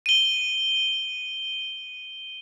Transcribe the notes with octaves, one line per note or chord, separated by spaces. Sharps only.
D#7 G7